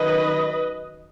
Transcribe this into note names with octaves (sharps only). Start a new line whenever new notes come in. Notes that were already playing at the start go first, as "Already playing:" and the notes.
Already playing: D#3 F#3 C#4 B4 D#5